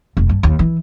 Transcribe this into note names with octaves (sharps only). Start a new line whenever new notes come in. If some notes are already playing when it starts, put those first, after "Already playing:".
F1
G2
D#2
E3